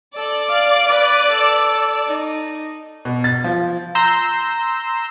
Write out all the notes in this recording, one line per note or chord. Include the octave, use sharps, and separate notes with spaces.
A4 D5
F5
B4
A4
D#4
B2
A6
F3
A#5 C6 E6 G6